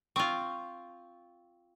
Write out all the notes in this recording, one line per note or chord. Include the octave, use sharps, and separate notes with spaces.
C4 F4 C#6